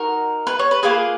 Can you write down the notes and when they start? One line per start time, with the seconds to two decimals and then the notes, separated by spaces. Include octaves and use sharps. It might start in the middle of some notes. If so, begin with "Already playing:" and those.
Already playing: D#4 F#4 A#4
0.47 B4
0.59 C#5
0.71 B4
0.83 A#3 F4 G#4 B4